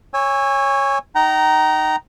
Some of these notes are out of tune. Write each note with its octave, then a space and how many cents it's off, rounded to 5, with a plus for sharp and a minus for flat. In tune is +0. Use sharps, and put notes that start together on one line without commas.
C#5 +0 G#5 -25 E6 +0
D#4 +0 G5 -35 A#5 +0